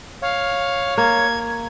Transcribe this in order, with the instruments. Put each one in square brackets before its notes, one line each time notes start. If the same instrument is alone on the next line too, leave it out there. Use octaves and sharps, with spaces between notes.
[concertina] C#5 [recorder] F5
[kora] A#3 [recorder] G#6